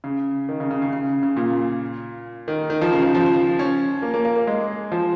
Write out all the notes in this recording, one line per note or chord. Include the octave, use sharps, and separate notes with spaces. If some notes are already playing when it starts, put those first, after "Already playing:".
C#3
D#3
C#3
C#3
C#3
C#3
C#3
A#2
D#3
D#3
F3
C#3
F3
F3
C#4
A#3
A#3
A#3
A#3
G#3
F3